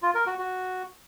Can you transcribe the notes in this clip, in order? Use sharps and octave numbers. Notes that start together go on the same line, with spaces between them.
F4
A#4
F#4
F#4